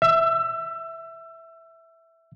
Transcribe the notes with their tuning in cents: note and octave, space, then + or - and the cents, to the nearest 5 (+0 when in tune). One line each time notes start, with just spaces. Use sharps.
E5 +0 E6 +25